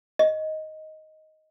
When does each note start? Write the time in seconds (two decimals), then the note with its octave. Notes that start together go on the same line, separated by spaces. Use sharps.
0.19 D#5